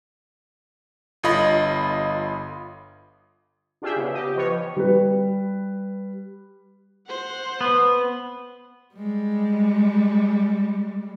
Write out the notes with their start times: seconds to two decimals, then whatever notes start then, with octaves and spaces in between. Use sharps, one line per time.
1.23 G1 F4 D#5 B5
3.82 D4 F4 G4 G#4 E5 G5
3.96 C#3 B3
4.14 G4 D#5
4.36 F3 B3 C#5
4.77 G3 B4
7.07 C5 F#5
7.61 B3
8.95 G3 G#3